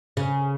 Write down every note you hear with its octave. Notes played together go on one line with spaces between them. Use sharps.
C#3